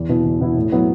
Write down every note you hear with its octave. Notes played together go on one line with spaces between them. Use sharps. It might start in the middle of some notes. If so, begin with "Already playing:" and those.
Already playing: E2
B2 B3 E4
E2
B2 B3 E4
A2
F#3 B3 E4